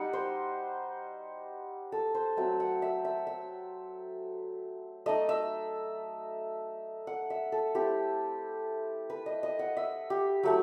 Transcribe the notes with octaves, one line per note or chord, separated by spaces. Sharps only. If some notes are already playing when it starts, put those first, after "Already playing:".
Already playing: G3 D#4 F#5
C5
A4
C5
F#3 A3 C4 E5
F#5
E5
E5
E5
A3 D#4 D#5
E5
F#5
E5
A4
A3 C4 E4 G4
B4
D#5
D#5
F#5
E5
G4
F#3 A3 E4